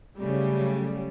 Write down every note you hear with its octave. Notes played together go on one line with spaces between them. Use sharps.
C#3 F#3 G3 A3